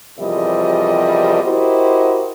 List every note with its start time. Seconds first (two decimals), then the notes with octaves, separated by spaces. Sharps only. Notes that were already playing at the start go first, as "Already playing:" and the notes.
0.19 E2 C3 F3 G3 A#4 D#5
1.43 E4 F#4 G4 A#4 C5 D#5